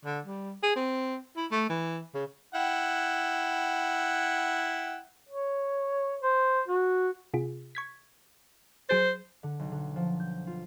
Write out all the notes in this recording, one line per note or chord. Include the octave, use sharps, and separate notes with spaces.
D3
G3
G#4
C4
E4
A3
E3
C#3
E4 F#5 G5
C#5
C5
F#4
C3 F4 G#4
C#6 G#6 B6
F#3 G#4 C5 A6
D3
B1
D3
F3
G6
F4